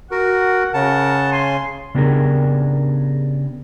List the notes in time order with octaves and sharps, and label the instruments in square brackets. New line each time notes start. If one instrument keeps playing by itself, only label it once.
[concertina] F#4 A#4 [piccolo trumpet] F#5
[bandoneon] C#3 [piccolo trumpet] A#4 [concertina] F#5 A5
[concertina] G#5 [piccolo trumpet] C6
[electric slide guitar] C#3 B3 D4 G4 G#4 A#4